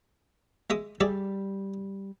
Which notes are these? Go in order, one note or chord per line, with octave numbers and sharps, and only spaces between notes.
G#3 E5 D#6
G3 G#4 D5 E5